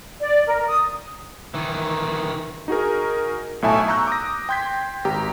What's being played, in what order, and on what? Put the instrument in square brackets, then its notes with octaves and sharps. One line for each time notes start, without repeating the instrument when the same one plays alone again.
[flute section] D5
A#4
D#6
[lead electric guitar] D#3 E3
[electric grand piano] D#4 F#4 G#4 A#4
B1 A2 E5 G#5 A5 C#6
A#5 C#6 E6 F#6 G6
D6 D#6 A#6
G5 C6 G6 G#6 B6
G#1 G4 A#5